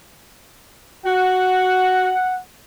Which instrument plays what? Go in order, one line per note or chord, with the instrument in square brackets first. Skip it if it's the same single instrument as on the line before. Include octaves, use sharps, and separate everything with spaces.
[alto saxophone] F#4 [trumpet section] F#5